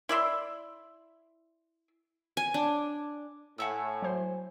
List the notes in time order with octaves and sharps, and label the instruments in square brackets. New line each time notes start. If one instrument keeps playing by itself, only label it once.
[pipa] E4 D5 E5 C6
[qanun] G#5
D4
[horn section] A2 [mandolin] F#5 G#5 E6
[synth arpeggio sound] F#3 C5